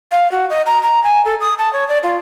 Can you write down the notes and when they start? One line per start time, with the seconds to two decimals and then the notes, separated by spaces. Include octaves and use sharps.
0.12 F5
0.32 F#4
0.50 D#5
0.66 A#5
0.83 A#5
1.03 G#5
1.25 A4
1.41 D#6
1.59 A5
1.73 C#5
1.88 D5
2.03 F4